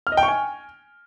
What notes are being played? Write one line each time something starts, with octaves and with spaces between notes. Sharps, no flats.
F6
D#5
G5
C#6
G#5